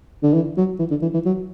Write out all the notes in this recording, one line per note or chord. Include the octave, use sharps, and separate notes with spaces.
D3
E3
F#3
E3
D3
E3
E3
F#3